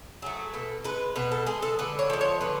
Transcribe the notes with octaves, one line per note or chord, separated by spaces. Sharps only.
F#3 A3 G#4
B2 A4
G#3 B4
B2 B4
A4
G#3 G#4
A4
D3 B4
C#5
F3 G#3
C#5
D3 B4